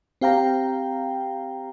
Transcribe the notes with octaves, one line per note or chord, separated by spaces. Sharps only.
C4 G4 F5 G5 A#5